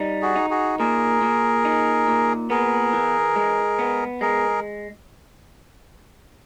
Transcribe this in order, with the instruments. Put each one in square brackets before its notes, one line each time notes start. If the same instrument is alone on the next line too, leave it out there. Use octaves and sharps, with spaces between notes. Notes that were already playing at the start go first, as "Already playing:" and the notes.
Already playing: [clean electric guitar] G3 D#4
[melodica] F#4 G#4
[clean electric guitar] D#4
[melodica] F#4 G#4
[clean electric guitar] A#2 [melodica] G#4 A#4
[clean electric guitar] A#2
D#4
A#2
[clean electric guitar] B3 [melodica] G#4 A#4
[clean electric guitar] E3
G#3
B3
[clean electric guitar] G#3 [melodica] G#4 A#4